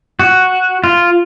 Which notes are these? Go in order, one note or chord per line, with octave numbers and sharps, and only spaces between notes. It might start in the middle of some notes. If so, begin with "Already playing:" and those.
F#4
F4